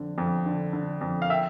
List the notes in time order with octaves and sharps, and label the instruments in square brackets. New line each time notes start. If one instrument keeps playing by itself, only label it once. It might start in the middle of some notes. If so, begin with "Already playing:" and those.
Already playing: [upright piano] F2 D3
F2
D3
D3
F2
F5
E5 G5